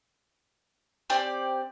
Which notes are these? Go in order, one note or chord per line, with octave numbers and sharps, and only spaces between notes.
C4 G4 D5